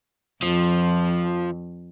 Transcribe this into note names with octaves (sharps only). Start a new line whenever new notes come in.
F2 F3